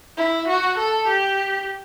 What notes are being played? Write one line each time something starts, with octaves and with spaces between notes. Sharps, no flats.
E4
F#4
A4
G4